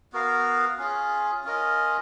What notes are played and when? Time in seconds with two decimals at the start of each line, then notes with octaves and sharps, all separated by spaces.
0.13 B3 F#4 A#4 F5
0.78 C#4 F4 G#4
1.44 C#4 F4 A#4 D#5